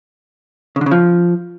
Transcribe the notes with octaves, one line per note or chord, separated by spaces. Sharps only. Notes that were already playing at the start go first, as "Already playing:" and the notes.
C#3
D3
C#3
F3